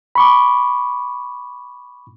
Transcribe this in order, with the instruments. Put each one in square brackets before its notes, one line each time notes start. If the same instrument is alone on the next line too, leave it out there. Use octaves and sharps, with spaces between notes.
[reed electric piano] B5 C#6 D6